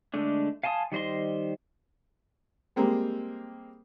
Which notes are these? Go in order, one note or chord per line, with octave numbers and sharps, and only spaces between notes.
D3 G#3 A3 D4
F5 G#5 A5 C6 D#6
D#3 G3 C5 D#5 C6
G3 G#3 A#3 C4